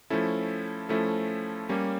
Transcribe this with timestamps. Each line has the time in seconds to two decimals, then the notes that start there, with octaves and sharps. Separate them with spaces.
0.10 F3 A3 C#4 E4 A4
0.89 F3 A3 C#4 E4 A4
1.69 G3 A#3 C#4